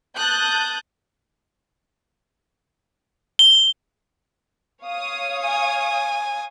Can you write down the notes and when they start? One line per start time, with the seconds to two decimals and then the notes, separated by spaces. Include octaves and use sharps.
0.16 A5 D#6 F#6 G6
3.39 G7
4.82 C#5 F5 D#6
5.45 G#5